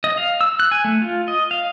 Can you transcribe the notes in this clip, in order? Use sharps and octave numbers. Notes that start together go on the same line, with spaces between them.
D#5
F5
E6
F#6
G#5
A3
F4
D#5
F5